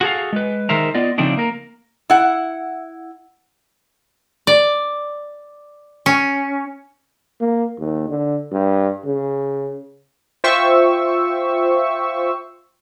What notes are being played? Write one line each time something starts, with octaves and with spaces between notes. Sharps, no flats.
F#4 G#4 A4 F5
G#3 B4
D#3 G#3 A#4 C5 E5 A#5
B3 F4 D5 D#5
C#3 F3 A3 C4 D4 D#4
A#3 A#4
E4 F#5
D5
C#4
A#3
D#2
D3
G2
C#3
F4 C5 E5 G5 C#6 E6